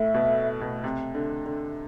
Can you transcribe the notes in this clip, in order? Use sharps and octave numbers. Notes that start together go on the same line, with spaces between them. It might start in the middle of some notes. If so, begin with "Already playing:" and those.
Already playing: A2 E5
B2
B2
C3
D3
D3